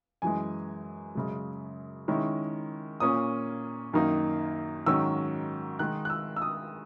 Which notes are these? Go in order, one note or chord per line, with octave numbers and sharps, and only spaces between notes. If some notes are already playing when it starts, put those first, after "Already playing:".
F#2 E3 G#3 G#5
F#2 C#3 G#3
D#3 G#3 C#4 E4
A#2 A#3 C#4 D#6
F#2 D#3 A#3 D#4
G#2 D#3 F#3 C#4 E6
D#3 G#3 D#4 F#6
F#6
E6
E6
D#6